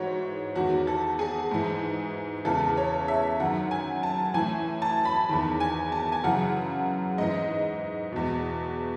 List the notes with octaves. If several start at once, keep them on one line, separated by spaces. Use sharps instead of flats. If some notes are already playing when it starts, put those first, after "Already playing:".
Already playing: G#2 E3 F#4 C#5
E2 D#3 F#4
A4
G#4
G#2 E3
E2 C#3 E3 A4
C#5
E5
F#2 D#3 F#5
G#5
A5
A2 E3 G#5
A5
B5
E2 D#3
G#5
A5
G#5
F#2 C#3 E3 F#5
G#2 E3 D#5
E2 B2